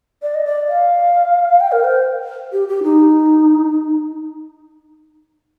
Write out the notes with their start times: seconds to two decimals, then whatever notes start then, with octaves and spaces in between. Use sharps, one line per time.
0.22 D5
0.34 D#5
0.45 D5
0.68 F5
1.61 G5
1.72 A#4
1.84 C5
2.52 G4
2.68 G4
2.83 D#4